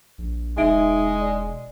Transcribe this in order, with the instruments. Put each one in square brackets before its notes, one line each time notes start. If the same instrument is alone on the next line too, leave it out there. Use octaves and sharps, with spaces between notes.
[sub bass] A#1
[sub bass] E1 [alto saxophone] G#3 [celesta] D#4 E5 D7
[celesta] D5